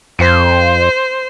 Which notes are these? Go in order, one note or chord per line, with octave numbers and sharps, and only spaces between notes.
F2 C5